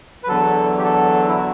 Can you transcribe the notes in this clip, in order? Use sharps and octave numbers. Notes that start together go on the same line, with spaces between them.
B4
E2 D3 F#3 A4
G4
A4
E4
F#4